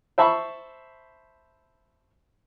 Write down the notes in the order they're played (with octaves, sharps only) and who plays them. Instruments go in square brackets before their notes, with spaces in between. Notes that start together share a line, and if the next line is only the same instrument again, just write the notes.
[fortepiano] C5 E5 A5 B5 C#6